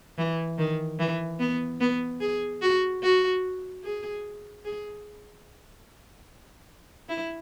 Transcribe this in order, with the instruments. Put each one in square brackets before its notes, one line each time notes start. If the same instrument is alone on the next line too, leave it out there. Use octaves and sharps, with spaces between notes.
[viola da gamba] E3
D#3
E3
B3
B3
G#4
F#4
F#4
G#4
G#4
E4